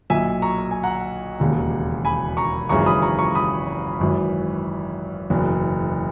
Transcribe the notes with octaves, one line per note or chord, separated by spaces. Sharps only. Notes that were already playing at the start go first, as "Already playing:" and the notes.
B1 A#2 E5 G#5
A#5 C#6
A#5
G#5
F#5 A#5
E1 D#2 C#3
G#5 B5
A#5 C#6
G#1 F#2 C#3 E3 A#5 C#6
B5 D#6
A#5 C#6
A#5 C#6
B5 D#6
G#1 F#2 E3
F#1 E2 B2